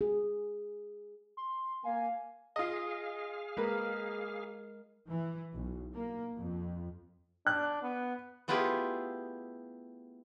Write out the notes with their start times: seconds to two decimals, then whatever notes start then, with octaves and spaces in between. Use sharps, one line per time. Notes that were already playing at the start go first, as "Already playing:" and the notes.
0.01 G#4
1.37 C6
1.85 A#3 F5 G#5
2.56 F4 G#4 D#5 F5
3.57 G#3 A#3 A#4 B4
5.08 E3
5.54 B1
5.94 A#3
6.38 F2
7.47 D4 F#6
7.82 B3
8.48 A3 B3 E4 F4 G4 G#4